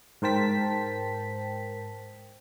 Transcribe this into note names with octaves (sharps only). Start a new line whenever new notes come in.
G#2 A#4 C5 G5 A5 B6